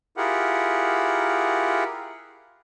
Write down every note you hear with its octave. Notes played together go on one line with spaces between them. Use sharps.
E4 F4 G4 G#4 A#4 F#5